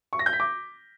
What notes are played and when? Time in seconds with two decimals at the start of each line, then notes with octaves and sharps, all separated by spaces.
0.13 C#6
0.19 A#6
0.26 G6
0.33 B6
0.40 D6